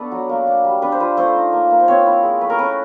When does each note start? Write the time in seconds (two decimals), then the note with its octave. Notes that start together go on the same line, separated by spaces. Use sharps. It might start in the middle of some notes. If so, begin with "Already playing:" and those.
Already playing: A3 B3 D4 A4 B4
0.11 F#3
0.29 A#3
0.47 D4
0.64 G3
0.82 D4 B4
0.92 C5
1.00 F4 B4
1.17 A3 C5
1.35 D#4
1.53 A#3
1.70 A#3
1.80 C5
1.88 C4 C#5
2.06 E4
2.23 G#3
2.41 A3 B4
2.50 A#4
2.58 C#4 B4